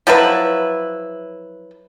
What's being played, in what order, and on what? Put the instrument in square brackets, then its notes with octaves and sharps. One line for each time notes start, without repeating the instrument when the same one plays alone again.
[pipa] F3 F#3 E4 B4